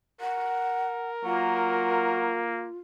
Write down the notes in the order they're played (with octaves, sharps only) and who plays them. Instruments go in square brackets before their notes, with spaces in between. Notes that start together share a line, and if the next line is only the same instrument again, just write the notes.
[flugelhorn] A#4 [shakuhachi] F#5
[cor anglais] F#3 [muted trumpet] A#3 [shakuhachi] F4